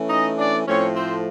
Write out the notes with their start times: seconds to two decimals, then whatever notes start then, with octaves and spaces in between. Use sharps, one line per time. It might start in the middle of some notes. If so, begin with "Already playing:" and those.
Already playing: E3 A3 C#4
0.10 D#4 D#5
0.38 D4 D5
0.67 A2 F3 A3 C4 C#4 C#5
0.95 C4 C5